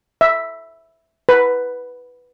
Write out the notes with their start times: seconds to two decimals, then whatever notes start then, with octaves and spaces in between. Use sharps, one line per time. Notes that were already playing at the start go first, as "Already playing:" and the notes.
0.21 E5
1.29 B4